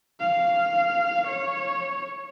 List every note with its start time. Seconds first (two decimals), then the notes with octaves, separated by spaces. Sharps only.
0.20 F5
1.27 C#5